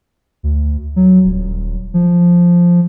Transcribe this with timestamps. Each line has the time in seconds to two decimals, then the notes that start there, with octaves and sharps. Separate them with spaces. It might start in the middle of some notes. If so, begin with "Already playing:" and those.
0.43 D2
0.96 F#3
1.24 D#1
1.94 F3